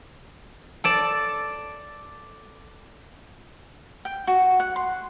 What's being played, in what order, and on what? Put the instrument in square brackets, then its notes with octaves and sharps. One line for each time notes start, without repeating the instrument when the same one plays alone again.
[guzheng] A4 D5 A5
[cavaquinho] G5
F#4
F#5
C6